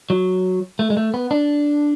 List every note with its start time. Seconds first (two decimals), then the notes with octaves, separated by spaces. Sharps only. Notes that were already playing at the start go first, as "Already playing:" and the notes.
0.10 F#3
0.79 A3
0.90 G#3
0.97 A3
1.14 B3
1.31 D4